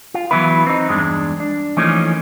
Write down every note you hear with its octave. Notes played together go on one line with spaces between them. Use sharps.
F4
E3 F#3 B3 E4 B4
C4 D#4
E2 G2 G#3 D4
D4
E3 F3 A3 A#3 C#4 D#4